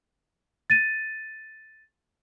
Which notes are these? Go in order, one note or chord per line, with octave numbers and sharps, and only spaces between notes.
A6 D#7